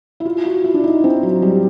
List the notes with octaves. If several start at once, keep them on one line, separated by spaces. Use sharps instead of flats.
E4
F4
F#4
E4
D4
D#4
C4
F#3
G3